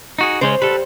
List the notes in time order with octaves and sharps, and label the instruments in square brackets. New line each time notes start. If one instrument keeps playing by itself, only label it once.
[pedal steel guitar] D#4 F#4 G#4
[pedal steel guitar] C#3 G#3 C#4 [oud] C5
[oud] G3 [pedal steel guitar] A4 B4